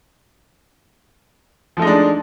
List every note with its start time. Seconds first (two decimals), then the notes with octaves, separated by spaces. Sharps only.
1.77 F3
1.79 A3
1.82 D#4
1.85 G#3
1.87 D4